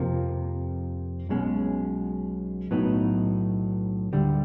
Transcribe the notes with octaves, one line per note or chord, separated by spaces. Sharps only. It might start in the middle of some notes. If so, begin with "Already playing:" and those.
Already playing: F2 C3 F3 A#3
B1 B2 G#3 C#4
B1 A2 F#3 B3 D#4
D2 D3 G3